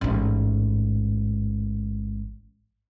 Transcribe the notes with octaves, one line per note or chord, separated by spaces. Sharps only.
A1 G#2